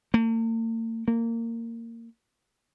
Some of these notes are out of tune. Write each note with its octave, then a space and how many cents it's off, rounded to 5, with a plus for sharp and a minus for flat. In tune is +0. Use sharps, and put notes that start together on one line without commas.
A#3 -45
A#3 -20